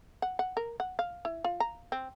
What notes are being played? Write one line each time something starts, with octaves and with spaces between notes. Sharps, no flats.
F#5
F#5
A#4
F#5
F5
E4
F4
A#5
C4